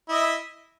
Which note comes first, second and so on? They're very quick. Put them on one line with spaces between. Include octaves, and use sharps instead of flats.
E4 D#5 E5